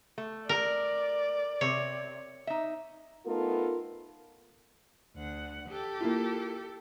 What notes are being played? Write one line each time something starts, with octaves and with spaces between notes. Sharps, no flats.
A3
A#4 D5
C3 C#5
D#4 E5
A3 B3 D#4 F4 A4 A#4
D2 F#5
G4 A4
A#3 E4 F4